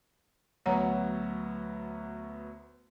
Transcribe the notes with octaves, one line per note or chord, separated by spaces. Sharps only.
D2 F#3 B3 C#5 F#5 A#5